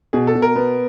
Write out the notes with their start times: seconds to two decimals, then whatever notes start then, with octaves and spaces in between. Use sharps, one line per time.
0.13 B2 G#4
0.27 A4
0.35 B2
0.42 A#4
0.56 B3